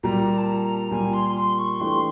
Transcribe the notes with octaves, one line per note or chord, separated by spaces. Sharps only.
A#2 G3 A#3 A#5
A5
A#5
A#2 G3 A#3 G#5
C6
C6
C#6
E3 A3 D4 G4 C6